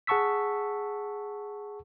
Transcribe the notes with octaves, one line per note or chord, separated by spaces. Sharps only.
G#4 F#5 A5 C#6 E6 B6